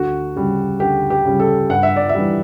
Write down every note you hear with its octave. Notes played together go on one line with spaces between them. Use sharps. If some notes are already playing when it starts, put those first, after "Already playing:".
Already playing: D2 F#4
C#3 G3
D2 G4
G4
C#3 G3
A4
G2 F#5
E5
D5
E5
E3 G3